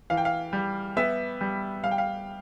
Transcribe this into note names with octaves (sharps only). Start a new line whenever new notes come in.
E3 F5
G5
F5
G3
B3 E5
G3
G3 F5
G5
F5